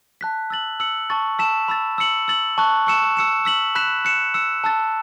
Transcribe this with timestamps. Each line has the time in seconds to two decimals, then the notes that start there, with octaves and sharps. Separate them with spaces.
0.21 A5 F#6 B6
0.50 E6 A6 F#7
0.80 E6 C#7 F#7
1.10 A5 C#6 A6
1.39 A5 E6 B6 E7
1.68 B5 E6 A6
1.98 E6 C#7 F#7
2.28 E6 A6 F#7
2.58 A5 C#6 F#6
2.87 C#6 E6 C#7 E7
3.17 E6 C#7 E7
3.45 E6 B6 F#7
3.75 B5 F#6 B6 E7
4.05 F#6 C#7 E7
4.34 E6 C#7 E7
4.64 A5 E6 A6